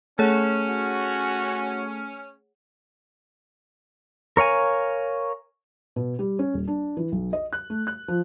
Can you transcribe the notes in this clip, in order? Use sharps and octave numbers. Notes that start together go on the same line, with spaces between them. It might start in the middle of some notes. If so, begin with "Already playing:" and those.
A3 C#4 G#4 C#5 F#5
F#4
A#4 C#5 F5 G#5
B2
G3
C#4
D#1
D4
E3
B1
D#5
F#6
A3
F#6
F3